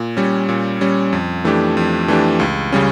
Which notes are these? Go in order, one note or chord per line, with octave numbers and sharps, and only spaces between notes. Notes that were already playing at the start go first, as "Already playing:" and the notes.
Already playing: A#2
G3 C#4
A#2
G3 C#4
F2
E3 A3 D4 G4
F2
E3 A3 D4 G4
C#2
C#3 G3 C#4